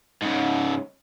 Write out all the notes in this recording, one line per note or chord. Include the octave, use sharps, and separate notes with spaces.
G#2 C#3